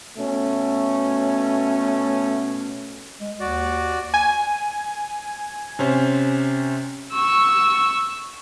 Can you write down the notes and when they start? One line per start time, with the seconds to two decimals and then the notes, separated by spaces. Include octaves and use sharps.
0.17 B2 A3 C#4
3.21 G#3
3.40 D#2 F#4 D5
4.14 G#5
5.79 C3 C#4 C5
7.12 C#6 E6